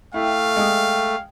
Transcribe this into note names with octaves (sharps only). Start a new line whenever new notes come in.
A3 E4 F5 G5
G#3 D#6